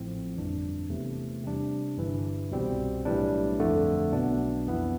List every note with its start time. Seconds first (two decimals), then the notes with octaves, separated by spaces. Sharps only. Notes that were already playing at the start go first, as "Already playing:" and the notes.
Already playing: A1 A2 F3 C4
0.36 G1 F2 E3 G3 D4
0.90 E2 C3 E3 A3
1.43 C3 G3 D4
1.97 G1 G2 E3
2.51 C2 B2 G3 C4
3.05 B1 A2 E3 G3 D4
3.59 G1 F2 D3 A3
4.13 B1 B2 B3 D4
4.67 F2 E3 B3 E4